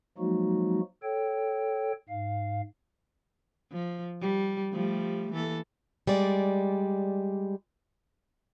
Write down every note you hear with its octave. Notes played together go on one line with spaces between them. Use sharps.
F3 F#3 G#3 A#3 D#4 F#4
A4 C#5 G5
G#2 F5
F3
G3
F3 G3 A3
E3 A#3 A4
G3 G#3 D5